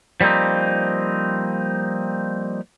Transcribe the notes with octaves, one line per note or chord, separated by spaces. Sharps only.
F3 G3 A#3 C4 D#4